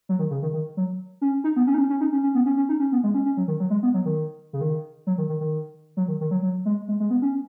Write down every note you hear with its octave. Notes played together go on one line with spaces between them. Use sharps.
F#3
D#3
C#3
D#3
D#3
F#3
C#4
D#4
B3
C#4
D#4
C#4
C#4
D#4
C#4
C#4
B3
C#4
C#4
D#4
C#4
B3
G#3
C#4
C#4
F#3
D#3
F#3
G#3
B3
F#3
D#3
C#3
D#3
F#3
D#3
D#3
D#3
F#3
D#3
D#3
F#3
F#3
G#3
G#3
G#3
B3
C#4